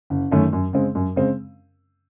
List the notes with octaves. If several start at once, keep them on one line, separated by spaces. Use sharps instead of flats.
F#1
F#2 D#3 A3 C#4
F#2
C#3 G#3 C4
F#2
C#3 G#3 C4